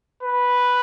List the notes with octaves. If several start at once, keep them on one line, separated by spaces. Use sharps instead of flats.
B4